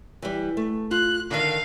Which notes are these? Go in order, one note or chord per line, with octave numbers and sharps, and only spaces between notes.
E3 G3
A3
F4 F#6
D3 D#3 F5